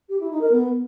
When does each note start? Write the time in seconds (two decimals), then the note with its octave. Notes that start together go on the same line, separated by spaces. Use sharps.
0.09 G4
0.20 E4
0.30 D#4
0.41 A#4
0.51 B3